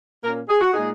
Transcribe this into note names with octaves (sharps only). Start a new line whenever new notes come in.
A#2 A#3 C#4 A#4
G#4
F#4
A#2 G#3 D#4 G#4